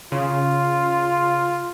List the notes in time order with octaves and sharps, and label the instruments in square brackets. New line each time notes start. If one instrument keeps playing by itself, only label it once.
[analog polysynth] C#3 [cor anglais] F4